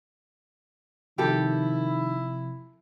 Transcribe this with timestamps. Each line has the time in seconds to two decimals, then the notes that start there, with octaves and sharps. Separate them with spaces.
1.18 C3 D#3 F3 C4 E4 G4 A4